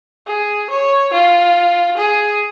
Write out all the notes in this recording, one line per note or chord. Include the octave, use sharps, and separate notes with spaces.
G#4
C#5
F4
G#4